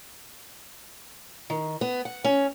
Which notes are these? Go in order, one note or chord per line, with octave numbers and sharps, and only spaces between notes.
D#3
B3
F#5
C#4